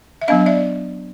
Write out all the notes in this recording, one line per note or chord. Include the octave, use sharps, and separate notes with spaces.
E5
F#3 B3 D4 D#5 F5
D5 E5